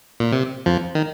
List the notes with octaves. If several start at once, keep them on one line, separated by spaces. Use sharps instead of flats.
A#2
C3
F2 F3
D#3